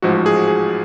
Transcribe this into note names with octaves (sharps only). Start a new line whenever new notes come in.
A1 G#2 F3 F#4
F#4
G#4
F#4
G#4